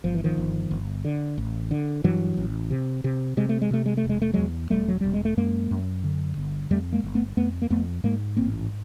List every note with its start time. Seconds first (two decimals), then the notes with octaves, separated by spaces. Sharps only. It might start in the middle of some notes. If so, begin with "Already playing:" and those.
0.04 G1 F3
0.14 E3
0.24 D#3 F3
0.38 G1
0.71 G1
1.05 D3
1.38 A1
1.71 D3
2.04 G2 E3 F#3
2.37 A1
2.71 C3
3.04 C3
3.37 C3 G#3
3.49 A3
3.62 G#3
3.71 C3 A3
3.86 G#3
3.97 A3
4.04 E1
4.09 G#3
4.22 A3
4.33 E2 F#3 G#3
4.70 E1 G3 A3
4.88 F#3
5.01 E1 G3
5.13 G#3
5.25 A3
5.37 F#2 G#3 A#3
5.71 F#2
6.04 D3
6.37 G1
6.71 F2 G3 A3
6.92 G#3 A#3
7.04 G1
7.15 A3 B3
7.37 F2 A3 B3
7.62 A#3
7.70 F2 A3 B3
8.04 G#2 G#3 A#3
8.37 A1 A#3 C4